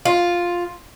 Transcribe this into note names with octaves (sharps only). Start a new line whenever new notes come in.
F4